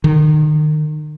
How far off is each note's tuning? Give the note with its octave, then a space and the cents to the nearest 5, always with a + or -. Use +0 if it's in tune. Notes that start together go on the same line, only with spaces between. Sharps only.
D#3 -35